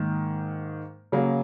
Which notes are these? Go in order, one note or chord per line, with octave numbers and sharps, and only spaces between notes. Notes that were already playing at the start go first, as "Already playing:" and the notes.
Already playing: G#2 D#3 A#3
C#3 F#3 A#3